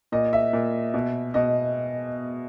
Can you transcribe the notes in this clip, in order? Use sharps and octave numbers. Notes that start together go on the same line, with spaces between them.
A#2 D#5
E5
A#2
B2
B2 D#5